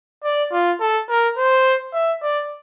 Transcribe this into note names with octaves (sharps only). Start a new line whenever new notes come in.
D5
F4
A4
A#4
C5
E5
D5